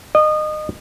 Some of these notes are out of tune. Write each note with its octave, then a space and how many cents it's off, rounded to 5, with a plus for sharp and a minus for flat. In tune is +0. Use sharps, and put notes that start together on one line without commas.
D#5 -25